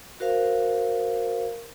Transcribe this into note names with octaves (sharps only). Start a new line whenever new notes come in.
F#4 A#4 C5 F5